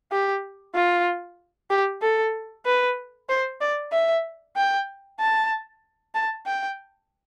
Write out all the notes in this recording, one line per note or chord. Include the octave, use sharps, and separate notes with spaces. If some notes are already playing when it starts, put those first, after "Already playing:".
G4
F4
G4
A4
B4
C5
D5
E5
G5
A5
A5
G5